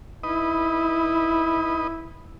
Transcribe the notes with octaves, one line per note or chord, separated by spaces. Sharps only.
D#4 E4 B4 D#5